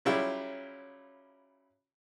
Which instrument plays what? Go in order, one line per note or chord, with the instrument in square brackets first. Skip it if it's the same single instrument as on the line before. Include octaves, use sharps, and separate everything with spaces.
[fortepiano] C#3 F#3 G3 E4 F4